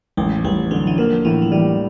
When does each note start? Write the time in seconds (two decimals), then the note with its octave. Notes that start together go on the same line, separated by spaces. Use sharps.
0.17 A1 G#3
0.44 A1 G3
0.71 D3 F#3
0.87 E3
0.98 F3 A#3
1.25 A2 E3
1.42 F3
1.51 E3 G3